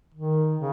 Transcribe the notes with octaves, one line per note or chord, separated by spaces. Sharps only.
D#3
C#3